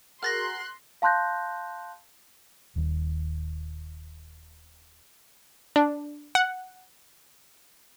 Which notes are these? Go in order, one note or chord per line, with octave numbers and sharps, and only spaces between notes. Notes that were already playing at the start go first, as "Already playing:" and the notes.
F#4 G#4 A#4 C6 F6 F#6 A6 A#6
F5 A5 C6 F#6 G6 A#6
D#1 D#2
D4
F#5